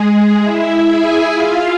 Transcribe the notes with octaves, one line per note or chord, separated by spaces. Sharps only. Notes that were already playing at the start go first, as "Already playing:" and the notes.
Already playing: G#3 G#4
E4 E5
G#4 G#5
F4 F5